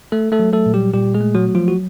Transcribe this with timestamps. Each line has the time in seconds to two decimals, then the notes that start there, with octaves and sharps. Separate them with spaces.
0.12 A3 A4
0.32 A3 A4
0.40 F#3
0.53 A3 A4
0.66 A#2
0.74 G3 G4
0.94 A#2 G3 G4
1.14 G#3 G#4
1.21 A3
1.35 F#3 F#4
1.48 F#3
1.55 F3 F4
1.68 F#4